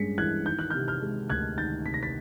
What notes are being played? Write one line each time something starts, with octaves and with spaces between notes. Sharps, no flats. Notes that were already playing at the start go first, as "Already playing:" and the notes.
Already playing: G2 G#3 C#4 B6 C#7
E3 F#6 G#6
D#3 G6
F#6
C3 F6 G6
F6 G6
G#3
D2 F#6 G#6
D#3 G6 A6
C3 B6
A#6
A6 B6